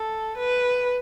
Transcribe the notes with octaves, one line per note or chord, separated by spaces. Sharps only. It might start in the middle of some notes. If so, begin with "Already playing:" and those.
Already playing: A4
B4